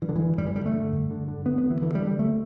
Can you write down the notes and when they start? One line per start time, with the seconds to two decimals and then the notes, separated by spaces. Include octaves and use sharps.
0.02 G2 E3
0.09 D3
0.16 G2 E3
0.38 G2 G3
0.46 E3
0.55 D3 G3
0.66 A3
0.74 D3
0.92 G2
1.11 D3
1.28 D3
1.46 D2 B3
1.58 B3
1.64 D2
1.70 E3
1.82 D3 E3
1.95 G3
2.01 D3
2.07 G3
2.19 D2 A3